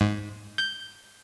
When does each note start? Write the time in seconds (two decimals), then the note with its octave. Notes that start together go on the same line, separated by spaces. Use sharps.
0.01 G#2
0.58 G6